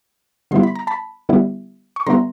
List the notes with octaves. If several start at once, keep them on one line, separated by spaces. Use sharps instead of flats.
D3 G3 B3 E4 C6
B5
A#5
A5 B5
D3 G3 B3 E4
C#6
D3 G3 B3 E4 A#5 C6